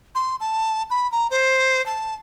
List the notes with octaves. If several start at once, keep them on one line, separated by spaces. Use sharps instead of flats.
C6
A5
B5
A#5
C5
A5